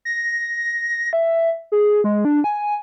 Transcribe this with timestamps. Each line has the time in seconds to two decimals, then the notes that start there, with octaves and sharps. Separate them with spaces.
0.05 A#6
1.13 E5
1.72 G#4
2.04 G#3
2.25 D4
2.44 G#5